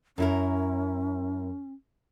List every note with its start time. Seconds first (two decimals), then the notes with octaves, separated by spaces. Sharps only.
0.18 F#2 C#4 E4 A#4